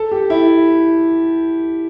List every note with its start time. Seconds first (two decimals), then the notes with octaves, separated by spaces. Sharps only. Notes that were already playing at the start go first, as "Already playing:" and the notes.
Already playing: A4
0.12 G4
0.30 E4